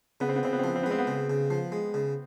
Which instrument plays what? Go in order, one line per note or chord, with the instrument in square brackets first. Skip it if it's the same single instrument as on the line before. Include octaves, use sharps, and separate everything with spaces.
[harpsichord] C#3 [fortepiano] B3
[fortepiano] C4
B3
[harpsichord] C#3 [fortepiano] C4
[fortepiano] B3
C4
[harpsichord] F3 [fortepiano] B3
[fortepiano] C4
B3
[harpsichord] G#3 [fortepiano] C4
[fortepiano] B3
[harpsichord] C#3
C#3
F3
G#3
C#3